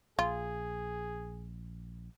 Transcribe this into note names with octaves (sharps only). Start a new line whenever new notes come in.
A#1 F4 G#4